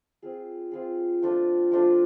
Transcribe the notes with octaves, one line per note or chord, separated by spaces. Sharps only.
C4 F4 G#4
C4 F4 G#4
F3 A3 D4 F4
F3 A3 D4 F4